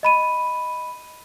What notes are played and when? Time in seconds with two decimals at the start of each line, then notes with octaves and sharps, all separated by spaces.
0.03 D#5 B5 D#7